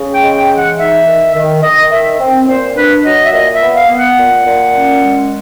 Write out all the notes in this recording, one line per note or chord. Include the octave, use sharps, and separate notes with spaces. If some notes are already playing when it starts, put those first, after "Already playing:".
Already playing: C#3
G5
G#3
G5
E3
F#5
D#4 E5
D#3
D#3
D#3 D#5
D#3 E5
C4
A#2 C5
D4 B4
F#3 D#5
E5
A#2 D#5
E5
B3
F5
B3
F#5
A#2
A#2
C#4
G#3